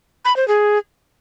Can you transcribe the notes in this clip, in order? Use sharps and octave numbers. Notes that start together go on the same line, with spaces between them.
B5
C5
G#4